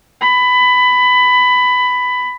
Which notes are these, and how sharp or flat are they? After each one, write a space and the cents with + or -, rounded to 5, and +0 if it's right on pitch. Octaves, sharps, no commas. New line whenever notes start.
B5 +15